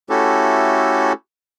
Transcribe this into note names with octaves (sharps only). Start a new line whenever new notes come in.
A3 C#4 E4 F#4 G4 A4